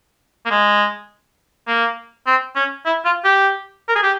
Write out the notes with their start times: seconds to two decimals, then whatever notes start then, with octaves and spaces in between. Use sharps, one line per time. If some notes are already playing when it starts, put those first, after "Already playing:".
0.46 A#3
0.50 G#3
1.67 A#3
2.26 C4
2.56 C#4
2.86 E4
3.05 F4
3.24 G4
3.88 A#4
3.95 G#4
4.03 G4